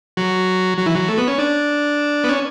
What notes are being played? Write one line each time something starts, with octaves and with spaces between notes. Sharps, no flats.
F#3
F#3
E3
F#3
A3
B3
C#4
D4
B3
C#4